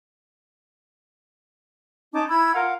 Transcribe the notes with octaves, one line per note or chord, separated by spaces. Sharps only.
C#4 D#4 A5 D6
E4 B5 E6 G#6
F4 A#4 F5 F#5